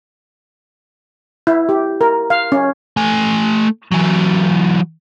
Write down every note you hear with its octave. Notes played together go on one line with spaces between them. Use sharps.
E4
G4
A#4
F5
C#4
A3 G#5
E3 F#3